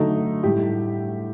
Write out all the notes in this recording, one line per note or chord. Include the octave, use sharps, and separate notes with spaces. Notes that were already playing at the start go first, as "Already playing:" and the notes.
Already playing: D3 F#3 A3 D#4
A2 G3 G4